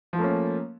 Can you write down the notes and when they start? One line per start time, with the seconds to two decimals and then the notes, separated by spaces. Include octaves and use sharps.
0.13 F3
0.16 F4
0.18 A3
0.21 A#3
0.24 C#4